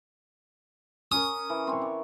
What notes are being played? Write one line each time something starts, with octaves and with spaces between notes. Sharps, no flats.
C#4 A#4 D#6
E3
C4 C#5
D5